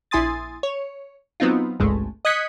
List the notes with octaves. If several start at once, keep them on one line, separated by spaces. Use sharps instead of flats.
A#1 E4 G#5 C6 D#6 A6
C#5
F#3 B3 C4 D#4 F4
G#1 C#2 G2 G#3 A3
D#5 D#6 F#6 G#6 B6 C#7